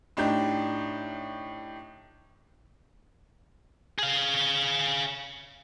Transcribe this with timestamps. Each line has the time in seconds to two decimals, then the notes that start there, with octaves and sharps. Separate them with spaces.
0.17 A2 D4 D#4 G4 G6
3.99 G#4 F5